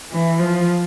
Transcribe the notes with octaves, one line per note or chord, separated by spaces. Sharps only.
E3
F3